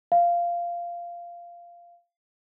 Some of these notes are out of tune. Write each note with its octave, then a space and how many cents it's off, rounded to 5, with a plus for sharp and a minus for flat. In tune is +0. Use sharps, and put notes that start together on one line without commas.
F5 -10